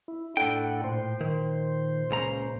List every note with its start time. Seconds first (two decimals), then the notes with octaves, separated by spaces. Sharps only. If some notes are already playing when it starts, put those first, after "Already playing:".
0.08 E4
0.37 A2 D4 A4 F#5 G5
0.84 A#2 C5
1.21 D#3
2.11 C#2 C#3 A#5